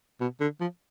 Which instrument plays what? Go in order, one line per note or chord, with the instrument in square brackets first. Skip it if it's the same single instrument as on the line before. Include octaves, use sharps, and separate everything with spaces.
[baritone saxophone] B2
D3
F3